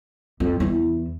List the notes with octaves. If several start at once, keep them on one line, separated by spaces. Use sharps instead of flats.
F2
E2 E3